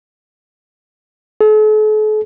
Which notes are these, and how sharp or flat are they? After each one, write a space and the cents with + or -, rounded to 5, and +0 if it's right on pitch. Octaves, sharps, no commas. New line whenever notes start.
A4 -45